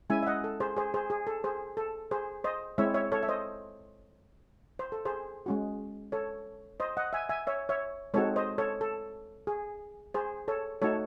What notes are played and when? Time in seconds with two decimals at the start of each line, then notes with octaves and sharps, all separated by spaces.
0.10 G#3 C#4 E4 E5 G#5
0.23 E5
0.26 D#5 F#5
0.44 A4
0.60 G#4 C5
0.77 G#4 C5
0.94 G#4 C5
1.10 G#4
1.27 A4
1.44 G#4 C5
1.77 A4
2.11 G#4 C5
2.44 C5 D#5
2.78 G#3 C4 E4 C#5 E5
2.94 C#5 E5
3.12 A4 C#5
3.23 E5
3.28 C5 D#5
4.79 C5
4.92 A4
5.05 G#4 C5
5.46 G#3 C#4 F#4
6.12 A4 C#5
6.80 C5 D#5
6.97 D#5 F#5
7.13 E5 G#5
7.29 E5 G#5
7.47 C#5 E5
7.69 C#5 E5
8.14 G#3 C4 D#4 F#4 A4 C#5
8.36 C5 D#5
8.58 A4 C#5
8.81 A4
9.47 G#4
10.14 G#4 C5
10.48 A4 C#5
10.82 A3 D#4 F#4 A4 C#5